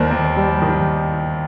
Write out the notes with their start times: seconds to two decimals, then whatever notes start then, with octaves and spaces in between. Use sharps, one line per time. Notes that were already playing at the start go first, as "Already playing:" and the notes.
Already playing: D#2 D#3 G3 A#4 C5 D5
0.11 D#2
0.37 G3
0.62 D#3